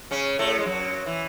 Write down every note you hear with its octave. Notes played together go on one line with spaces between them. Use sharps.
C#3 C#4
A2 A3
G#3
F#2 F#3
E3